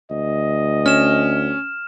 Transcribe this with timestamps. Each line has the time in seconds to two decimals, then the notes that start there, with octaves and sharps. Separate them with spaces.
0.11 D2 D#5
0.86 C#4 F6 E7